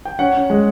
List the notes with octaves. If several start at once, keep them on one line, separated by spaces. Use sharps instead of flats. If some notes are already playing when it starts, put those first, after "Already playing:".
G5
C#4 F#5
C#4
G#3